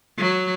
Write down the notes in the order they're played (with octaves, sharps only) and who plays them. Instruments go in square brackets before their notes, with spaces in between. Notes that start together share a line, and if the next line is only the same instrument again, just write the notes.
[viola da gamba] F#3